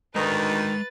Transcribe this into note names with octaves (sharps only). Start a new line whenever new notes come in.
D2 D#3 G#3 D#4 B4 A#5 A6